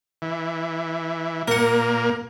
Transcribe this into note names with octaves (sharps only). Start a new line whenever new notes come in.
E3
A#2 A#3 A#4 F#5